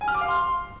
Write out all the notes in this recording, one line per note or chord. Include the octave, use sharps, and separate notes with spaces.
G#5
F6
D6
F5
C6